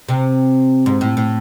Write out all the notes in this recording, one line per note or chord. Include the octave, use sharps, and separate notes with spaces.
C3
G#2
A2
A2